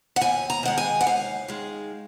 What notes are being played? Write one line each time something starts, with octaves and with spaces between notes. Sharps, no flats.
F#5
D#2 G#5
A#5
D#3 G#3 F#5
G#5
F#5
D#2 F5
D#3 G#3